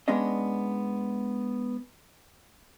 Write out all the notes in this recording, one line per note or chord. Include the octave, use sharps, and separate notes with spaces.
G#3 B3 C#4 D4 D#5